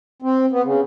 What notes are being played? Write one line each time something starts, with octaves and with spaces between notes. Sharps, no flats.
C4
B3
C#3